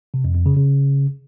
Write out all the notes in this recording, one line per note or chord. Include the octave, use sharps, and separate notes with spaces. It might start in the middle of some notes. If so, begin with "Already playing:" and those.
C3
F2
F2
C#3
C#3